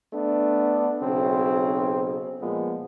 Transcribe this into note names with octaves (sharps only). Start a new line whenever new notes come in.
A3 B3 D4
B1 C#3 C4
A#2 F3 G#3 B3